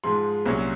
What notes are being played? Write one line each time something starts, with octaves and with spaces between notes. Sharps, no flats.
G#2 F3 G#3 C6
C2 A#2 F#3 C#4